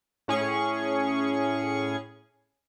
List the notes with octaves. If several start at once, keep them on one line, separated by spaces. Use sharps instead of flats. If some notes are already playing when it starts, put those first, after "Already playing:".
A2 C#4 G#4 C#6